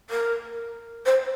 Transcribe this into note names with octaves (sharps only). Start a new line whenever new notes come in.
A#4
C5